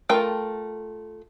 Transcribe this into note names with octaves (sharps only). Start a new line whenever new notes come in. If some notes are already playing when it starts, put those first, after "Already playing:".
A3 F4 A#4 G5